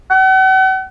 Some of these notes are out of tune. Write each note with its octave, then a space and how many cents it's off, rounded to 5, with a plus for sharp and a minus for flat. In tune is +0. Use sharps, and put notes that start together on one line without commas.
F#5 +40